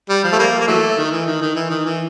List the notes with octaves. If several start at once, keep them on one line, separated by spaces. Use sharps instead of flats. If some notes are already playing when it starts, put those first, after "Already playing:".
G3
F3
A3
F3 G3 A#3
A#3
E3 F#3 A3
D#3
E3
D#3
D#3
E3
D#3
E3